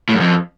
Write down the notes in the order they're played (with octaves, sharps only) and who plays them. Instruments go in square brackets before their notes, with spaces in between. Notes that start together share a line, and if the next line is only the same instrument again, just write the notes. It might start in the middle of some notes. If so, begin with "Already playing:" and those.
[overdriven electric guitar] A2
F#2
F2